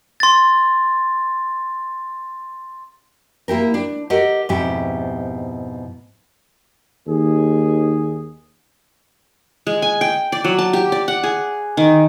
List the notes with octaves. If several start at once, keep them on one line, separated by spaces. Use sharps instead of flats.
C6 A6
A#3 E4 G4 A#4
D4
G4 A4 A#4 D#5 F#5
F2 G#2 B2 E4 G4
D#2 G#4
G#3
G#5
G5
D5
F#3
A5
G4
D5
F#5
G#4
D#3